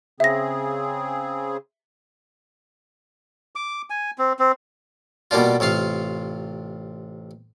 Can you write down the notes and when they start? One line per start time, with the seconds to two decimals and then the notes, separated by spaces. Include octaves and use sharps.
0.20 C#3 C4 G#4 E5 A#6
3.55 D6
3.90 G#5
4.18 C4
4.39 C4
5.31 B2 G3 A#3 D4 F4
5.60 A1 C3 F4 F5